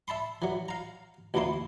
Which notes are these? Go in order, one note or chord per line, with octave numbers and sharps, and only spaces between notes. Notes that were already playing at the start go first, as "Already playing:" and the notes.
E5 A5 B5 C6
E3 F#3
F5 A#5
A1 D2 B2 A#3 E4 C6